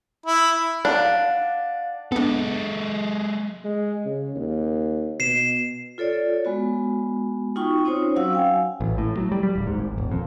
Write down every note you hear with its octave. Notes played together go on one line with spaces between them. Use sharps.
E4
D4 F5 F#5
G#3 B3 D4 A4
G#3
C#3
D#2
B2 C7 E7
F4 A4 C#5 D5
G#3 B3 F#4
D#4 F4 F#4 G5 C#6
C4 C#4 D#4 F4 C5 C#5
F#3 C#4 F#4 F5 F#5 E6
F5 G5 G#5
A1
A2
F#3
G3
G3
D1
G#2
G#1
D#1
F2